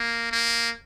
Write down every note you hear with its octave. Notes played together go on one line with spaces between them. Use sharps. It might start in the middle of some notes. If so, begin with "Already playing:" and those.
Already playing: A#3
A#3